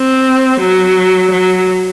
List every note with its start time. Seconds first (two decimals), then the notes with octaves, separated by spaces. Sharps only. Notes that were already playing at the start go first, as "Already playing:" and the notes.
Already playing: C4
0.60 F#3
1.31 F#3